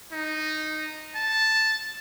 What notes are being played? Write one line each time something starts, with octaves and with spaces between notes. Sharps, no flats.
D#4
A5